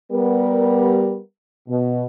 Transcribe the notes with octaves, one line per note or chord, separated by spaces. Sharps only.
G3 B3 A#4
B2